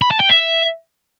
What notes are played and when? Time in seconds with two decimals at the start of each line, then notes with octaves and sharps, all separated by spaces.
0.02 B5
0.11 A5
0.20 G5
0.30 E5